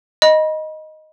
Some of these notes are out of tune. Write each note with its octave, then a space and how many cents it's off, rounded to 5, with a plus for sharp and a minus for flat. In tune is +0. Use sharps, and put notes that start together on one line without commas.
D#5 +0 B5 -35